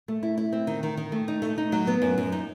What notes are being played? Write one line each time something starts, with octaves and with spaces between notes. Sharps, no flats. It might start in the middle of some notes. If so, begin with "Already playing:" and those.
A3
E4
E4
C4
D#3
D#3
D#3
A3
D#4
A3
D#4
F#3
B3
F#2
F#2
D#4